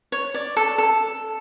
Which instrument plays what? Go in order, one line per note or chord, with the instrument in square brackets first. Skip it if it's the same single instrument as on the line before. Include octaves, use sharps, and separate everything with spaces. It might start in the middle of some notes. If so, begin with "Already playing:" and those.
[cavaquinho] C#5
D5
A4
A4